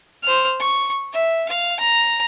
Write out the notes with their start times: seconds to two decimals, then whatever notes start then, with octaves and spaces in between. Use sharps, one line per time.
0.23 C5 F6
0.60 C#6
1.13 E5
1.49 F5
1.80 A#5